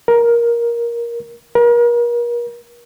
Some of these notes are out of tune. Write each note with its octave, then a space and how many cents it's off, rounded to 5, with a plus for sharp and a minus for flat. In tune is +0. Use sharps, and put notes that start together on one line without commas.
A#4 +10
A#4 +35